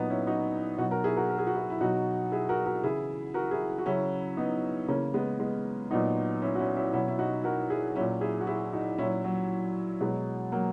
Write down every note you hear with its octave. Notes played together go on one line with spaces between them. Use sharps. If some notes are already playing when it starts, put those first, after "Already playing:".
Already playing: A#2 F#3 B3 D#4
C#4 E4
D#4 F#4
B2 F#3 D#4 F#4
F#4 A#4
E4 G#4
F#4 A#4
A#4
G#4
F#4
E4 G#4
E4
B2 F#3 D#4 F#4
E4 G#4
F#4 A#4
F#4 A#4
C#3 E3 E4 G#4
F#4 A#4
E4 G#4
F#4
C#3 F#3 C#4 E4
B3 D#4
C#3 E3 A#3 C#4
G#3 B3
G#3 B3
A#2 F#3 B3 D#4
C#4 E4
F#4
C#4 E4
C#4 E4
B2 F#3 C#4 E4
E4
D#4 F#4
F#4 A#4
E4 G#4
A#2 F#3 C#4 E4
E4 G#4
F#4
E4 G#4
D#4 F#4
A#2 F#3 C#4 E4
F#3
B2 F#3 G#3
F#3 A#3